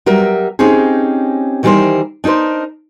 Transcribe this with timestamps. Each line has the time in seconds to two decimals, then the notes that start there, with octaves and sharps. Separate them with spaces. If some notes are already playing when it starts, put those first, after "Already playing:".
0.06 F#3 G3 A#4 E5
0.59 C4 C#4 D#4 G4 G#4
1.63 D#3 E3 G3 F#4 A#4 C5
2.24 D4 D#4 G#4 A#4 C5